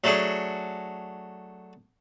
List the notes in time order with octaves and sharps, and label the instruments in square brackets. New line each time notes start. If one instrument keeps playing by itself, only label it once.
[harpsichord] F#3 A3 D4 F#4 G#4